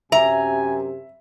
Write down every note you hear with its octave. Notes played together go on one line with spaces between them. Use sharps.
F#2 C3 E5 G#5 A#5